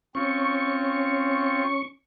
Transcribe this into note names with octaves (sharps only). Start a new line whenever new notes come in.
C4 C#4 F4 C#6